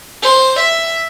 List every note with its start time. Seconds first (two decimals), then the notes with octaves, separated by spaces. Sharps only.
0.23 C5
0.59 E5